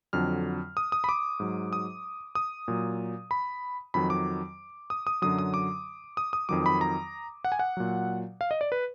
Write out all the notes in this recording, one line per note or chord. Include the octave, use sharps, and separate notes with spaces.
F2 D3 F#3 F6
D#6
D#6
B5
D6
G#2 F#3
D#6
D#6
A#2 F#3
B5
F2 D#3 F#3 B5
D6
D#6
D#6
F#2 D3 F#3 D#6
D#6
D6
D#6
D#6
F2 D#3 F#3 D6
B5
A#5
F#5
G#5
F#5
A#2 F#3
F5
D#5
D5
B4